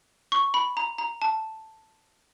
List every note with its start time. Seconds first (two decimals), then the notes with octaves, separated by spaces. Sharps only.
0.32 C#6
0.54 B5
0.77 A#5
0.98 A#5
1.22 A5